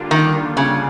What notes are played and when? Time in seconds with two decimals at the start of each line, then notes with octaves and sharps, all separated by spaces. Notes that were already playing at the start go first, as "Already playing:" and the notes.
Already playing: D3 G3 A#3 D4 F4
0.11 D#3
0.57 C#3